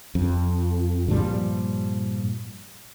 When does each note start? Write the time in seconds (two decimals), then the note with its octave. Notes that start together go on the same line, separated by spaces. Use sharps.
0.15 F2
1.08 G2 A#2 F3 G3